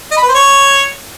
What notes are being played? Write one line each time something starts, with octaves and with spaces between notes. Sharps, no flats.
D#5
B5
B4
C5
C#5